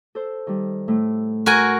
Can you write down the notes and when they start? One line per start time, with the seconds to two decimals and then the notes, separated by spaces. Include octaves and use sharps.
0.15 A4 C5
0.47 D#3 G3
0.88 A2 A3
1.46 F#4 A#4 G#5